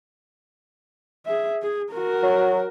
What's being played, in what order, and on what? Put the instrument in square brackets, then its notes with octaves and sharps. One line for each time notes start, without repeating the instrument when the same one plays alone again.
[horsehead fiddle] G#4 E5
G#4
F#4 A#4
[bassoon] F#3